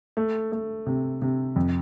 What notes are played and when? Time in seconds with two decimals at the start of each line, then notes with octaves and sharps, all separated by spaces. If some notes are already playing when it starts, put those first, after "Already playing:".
0.17 A3
0.52 A3
0.86 C3
1.22 C3
1.56 F2